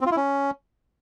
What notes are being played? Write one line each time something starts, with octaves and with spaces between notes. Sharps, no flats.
C4
F4
E4
C#4